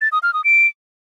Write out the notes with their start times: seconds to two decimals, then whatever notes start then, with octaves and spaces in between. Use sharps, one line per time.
0.01 A6
0.12 D#6
0.23 F6
0.34 D#6
0.44 D7